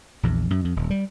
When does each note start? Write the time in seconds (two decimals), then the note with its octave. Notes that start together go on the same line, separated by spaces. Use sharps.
0.23 A#1 E2
0.50 F#2
0.65 F2
0.76 D#1
0.91 G3